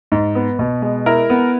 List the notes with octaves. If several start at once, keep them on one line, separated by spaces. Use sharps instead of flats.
G#2
B3
B2
G#3
E4 A#4
B3